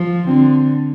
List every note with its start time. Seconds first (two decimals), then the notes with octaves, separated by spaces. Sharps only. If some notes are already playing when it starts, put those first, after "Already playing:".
Already playing: F3
0.27 D3 C4